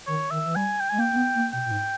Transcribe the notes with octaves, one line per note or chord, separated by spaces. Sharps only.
D#3 C#5
D#3 E5
E3
G3 G#5
G5
G#3 G#5
A#3 G5
A#3
B3
A#3
B2 G5
A#2
G#2